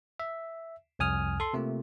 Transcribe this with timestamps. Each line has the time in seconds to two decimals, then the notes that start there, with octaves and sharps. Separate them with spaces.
0.20 E5
0.99 C2 F2 G#5 D#6 F6
1.40 A4 C6
1.53 C3 A3 A#3 F4